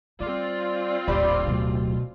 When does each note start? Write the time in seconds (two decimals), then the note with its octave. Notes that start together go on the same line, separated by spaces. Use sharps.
0.20 G3 C4 F4 D5
1.08 D#1 A1 G4 C5 D5 B5
1.47 D1 B2 F#3